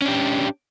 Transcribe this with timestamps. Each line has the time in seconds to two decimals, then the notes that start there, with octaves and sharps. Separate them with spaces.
0.02 C#4
0.05 D4
0.08 G4